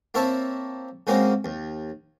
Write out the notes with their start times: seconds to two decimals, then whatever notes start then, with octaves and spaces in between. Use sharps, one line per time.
0.14 A#3 C4 E4 C#5 E5 A5
1.07 C#3 G#3 A#3 C4 F#4
1.45 D#2